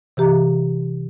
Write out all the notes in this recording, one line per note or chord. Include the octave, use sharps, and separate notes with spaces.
C3 E3 G4 A#5